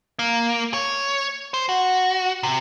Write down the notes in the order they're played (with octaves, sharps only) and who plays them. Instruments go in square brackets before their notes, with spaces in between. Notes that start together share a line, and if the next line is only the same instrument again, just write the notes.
[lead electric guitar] A#3
C#5
C5
F#4
C3